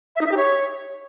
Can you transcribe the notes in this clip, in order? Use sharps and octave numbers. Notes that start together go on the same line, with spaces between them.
E5
D#4
E5
G4
C#5